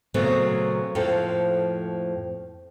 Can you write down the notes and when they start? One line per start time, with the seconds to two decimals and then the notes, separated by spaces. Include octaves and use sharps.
0.14 A#2 C#3 F#3 A3 B3 C4
0.95 F2 A2 F3 A#3 A4